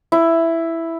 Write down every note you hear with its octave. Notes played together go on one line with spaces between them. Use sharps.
E4